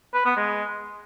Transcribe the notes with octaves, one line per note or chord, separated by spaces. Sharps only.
B4
B3
G#3